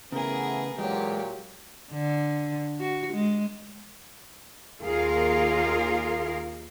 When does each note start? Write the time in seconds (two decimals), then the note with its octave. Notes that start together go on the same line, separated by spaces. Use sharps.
0.12 C#3 E3 A3 B3 G#4 A#4
0.78 A#2 E3 F#3 G#3 G4
1.92 D3
2.80 F#4
3.13 G#3
4.83 D#2 F4 G#4 A#4 F5